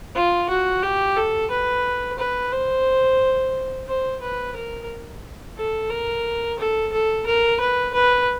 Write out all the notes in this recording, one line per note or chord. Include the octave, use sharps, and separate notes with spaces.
F4
F#4
G4
A4
B4
B4
C5
C5
B4
A#4
A4
A#4
A4
A4
A#4
B4
B4